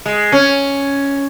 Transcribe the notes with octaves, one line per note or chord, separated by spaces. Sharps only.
G#3
C#4